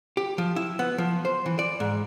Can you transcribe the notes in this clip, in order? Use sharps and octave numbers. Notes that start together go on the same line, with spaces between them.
G4
F3
E4
B3
F3
C5
E3
D5
G#2